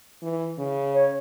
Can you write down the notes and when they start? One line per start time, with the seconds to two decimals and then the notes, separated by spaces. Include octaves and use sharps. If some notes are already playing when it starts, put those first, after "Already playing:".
0.22 E3
0.58 C#3
0.94 C#5